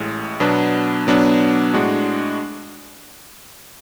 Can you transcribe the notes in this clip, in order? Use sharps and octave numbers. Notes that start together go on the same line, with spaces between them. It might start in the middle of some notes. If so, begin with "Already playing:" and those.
Already playing: A1 A2 G#3
B2 F#3 B3 D4
B2 F#3 B3 D4
A2 G#3 D4 F#4